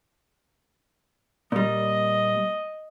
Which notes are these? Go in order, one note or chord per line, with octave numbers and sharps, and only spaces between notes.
A#2 G3 D#5